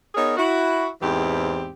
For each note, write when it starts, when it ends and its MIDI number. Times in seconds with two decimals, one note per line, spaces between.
0.15 0.36 59
0.15 0.36 63
0.15 0.36 68
0.15 0.36 70
0.15 0.36 73
0.36 0.88 64
0.36 0.88 66
1.01 1.70 40
1.01 1.70 44
1.01 1.70 52
1.01 1.70 60
1.01 1.70 67